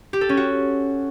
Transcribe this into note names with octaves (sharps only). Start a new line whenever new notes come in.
G4
A4
C#4
F#4